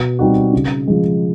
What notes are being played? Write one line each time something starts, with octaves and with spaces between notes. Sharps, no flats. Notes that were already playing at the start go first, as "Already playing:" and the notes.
Already playing: B2
G3 C4 D#4 F#4
C#3
F3 G#3